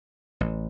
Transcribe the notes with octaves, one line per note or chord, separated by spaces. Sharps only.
A1